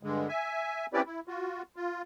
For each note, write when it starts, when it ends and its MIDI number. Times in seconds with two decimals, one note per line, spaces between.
0.03 0.28 43
0.03 0.28 50
0.03 0.28 56
0.29 0.86 76
0.29 0.86 80
0.93 1.02 60
0.93 1.02 61
0.93 1.02 64
0.93 1.02 67
0.93 1.02 71
0.93 1.02 74
1.06 1.20 64
1.28 1.62 65
1.28 1.62 66
1.76 2.02 65